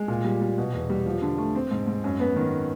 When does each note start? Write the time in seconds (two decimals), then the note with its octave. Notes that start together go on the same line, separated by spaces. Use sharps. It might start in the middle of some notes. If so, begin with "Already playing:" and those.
Already playing: G#3
0.08 A#2
0.24 G3
0.41 G3
0.58 B2
0.73 E2
0.90 G3
1.06 F3
1.22 D3
1.38 A3
1.55 C4
1.71 G#2
1.87 G#2
2.04 F#2
2.20 B3
2.36 D#3